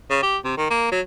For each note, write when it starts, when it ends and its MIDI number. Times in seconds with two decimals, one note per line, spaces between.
0.10 0.19 49
0.23 0.38 67
0.44 0.52 48
0.57 0.70 51
0.70 0.89 58
0.92 1.01 54